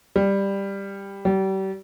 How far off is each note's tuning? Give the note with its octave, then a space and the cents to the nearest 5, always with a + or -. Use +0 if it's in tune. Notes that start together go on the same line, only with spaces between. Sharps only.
G3 +10
G3 -35